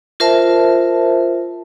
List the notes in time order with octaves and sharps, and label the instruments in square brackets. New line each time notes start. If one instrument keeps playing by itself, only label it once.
[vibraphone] F4 A#4 C5 E5 A5